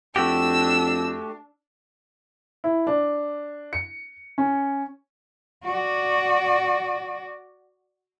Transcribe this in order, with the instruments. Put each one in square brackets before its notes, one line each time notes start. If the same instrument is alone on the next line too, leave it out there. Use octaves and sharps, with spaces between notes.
[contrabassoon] F2 [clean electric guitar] A3 F#4 G4 [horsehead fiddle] D4 [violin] E6
[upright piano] E4
D4
C#7
C#4
[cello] F#4 D5